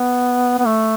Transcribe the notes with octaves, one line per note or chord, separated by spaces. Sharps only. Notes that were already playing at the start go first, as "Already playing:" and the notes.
Already playing: B3
B3
A3